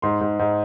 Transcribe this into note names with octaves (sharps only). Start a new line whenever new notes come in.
G#2 C6
G#2
G#2